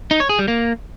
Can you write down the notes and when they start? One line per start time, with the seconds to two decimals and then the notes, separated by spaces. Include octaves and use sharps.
0.11 D#4
0.20 C#5
0.29 G#4
0.39 G3
0.48 A#3